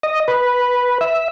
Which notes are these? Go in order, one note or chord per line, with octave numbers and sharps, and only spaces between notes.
D#5
B4
E5